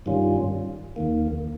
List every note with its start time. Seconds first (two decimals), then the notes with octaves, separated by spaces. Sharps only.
0.06 G2 D#3 G3 C#4 F4
0.96 D#2 D#3 A#3